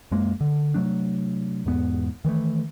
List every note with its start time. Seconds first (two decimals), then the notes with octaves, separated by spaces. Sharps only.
0.11 F#2 G#3 A#3
0.41 D3
0.74 C3 F#3 A3 D4
1.66 E2 G#2 B3
2.25 D#3 E3 G#3 A3